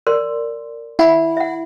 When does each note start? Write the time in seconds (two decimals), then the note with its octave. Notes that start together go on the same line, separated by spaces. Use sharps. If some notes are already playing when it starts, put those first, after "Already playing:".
0.07 A#4 D5 C6
0.99 E4 F#5 B5
1.37 E5 F#5